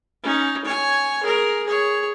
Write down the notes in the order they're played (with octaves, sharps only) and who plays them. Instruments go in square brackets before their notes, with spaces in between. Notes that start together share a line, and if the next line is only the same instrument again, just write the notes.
[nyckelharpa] C#4 D#4
C#5 G#5
G#4 A#4
G#4 C#5